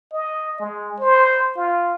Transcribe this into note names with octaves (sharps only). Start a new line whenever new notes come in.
D#5
G#3
C5
F4